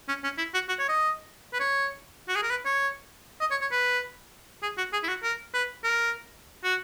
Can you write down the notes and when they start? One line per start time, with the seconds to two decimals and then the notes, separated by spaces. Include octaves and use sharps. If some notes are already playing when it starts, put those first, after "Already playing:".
0.09 C#4
0.24 C#4
0.38 E4
0.54 F#4
0.69 F#4
0.79 C#5
0.89 D#5
1.53 B4
1.60 C#5
2.29 F#4
2.36 G#4
2.43 A#4
2.50 B4
2.65 C#5
3.41 D#5
3.51 C#5
3.61 C#5
3.72 B4
4.63 G#4
4.78 F#4
4.93 G#4
5.04 E4
5.08 F#4
5.23 A#4
5.54 B4
5.84 A#4
6.64 F#4